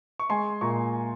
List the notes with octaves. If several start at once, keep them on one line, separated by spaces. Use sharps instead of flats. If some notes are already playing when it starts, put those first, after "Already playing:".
C#6
G#3 G#5 C6
A#2 A#5 C#6